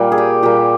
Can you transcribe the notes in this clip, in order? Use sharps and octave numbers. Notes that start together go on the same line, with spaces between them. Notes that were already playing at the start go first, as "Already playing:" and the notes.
Already playing: A#2 G3 A#3
G#4
G4
A#2 G3 A#3 G4